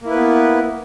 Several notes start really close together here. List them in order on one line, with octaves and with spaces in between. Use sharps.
A#3 E4 B4 B3